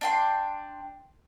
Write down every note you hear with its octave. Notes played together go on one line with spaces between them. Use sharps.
D4 G5 C6